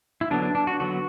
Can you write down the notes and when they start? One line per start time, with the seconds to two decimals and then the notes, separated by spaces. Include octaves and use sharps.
0.21 E4
0.31 D3 F#3 B3 D4
0.42 D4
0.55 D4
0.67 F#4
0.80 D3 F#3 B3 F#4